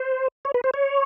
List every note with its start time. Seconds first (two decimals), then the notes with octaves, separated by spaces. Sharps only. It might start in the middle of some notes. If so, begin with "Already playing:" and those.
Already playing: C5
0.45 C#5
0.54 B4
0.64 C5
0.74 C#5